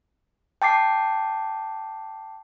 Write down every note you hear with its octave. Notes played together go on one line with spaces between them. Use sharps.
G5 A5 D6 C7